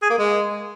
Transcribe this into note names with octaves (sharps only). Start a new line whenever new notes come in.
G#4
A#3
G#3